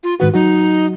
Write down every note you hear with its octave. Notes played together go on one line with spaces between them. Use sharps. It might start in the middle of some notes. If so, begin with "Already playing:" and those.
F4
G#2 D#3 F#4 B4
F#3 D#4 F#4